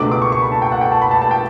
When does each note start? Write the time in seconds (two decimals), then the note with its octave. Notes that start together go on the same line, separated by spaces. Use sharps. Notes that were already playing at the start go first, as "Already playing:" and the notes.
Already playing: C#2 B2 A3 D4 D6
0.12 D6
0.22 C#6
0.32 C#6
0.42 B5
0.52 A5
0.62 G5
0.72 F#5
0.81 G5
0.92 A5
1.02 B5
1.11 A5
1.22 A5
1.31 G5